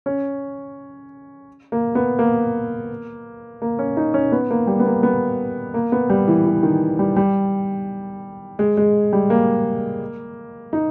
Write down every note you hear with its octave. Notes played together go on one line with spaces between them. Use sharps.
C#4
A#3
B3
A#3
A#3
C#4
D#4
C#4
B3
A#3
G3
B3
A#3
B3
A#3
B3
G3
E3
E3
D#3
G3
G3
G#3
G#3
G3
A#3
D#4